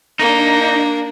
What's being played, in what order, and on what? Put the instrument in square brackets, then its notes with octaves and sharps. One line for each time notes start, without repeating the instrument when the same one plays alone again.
[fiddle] A#3 [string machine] D4 [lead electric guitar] D#4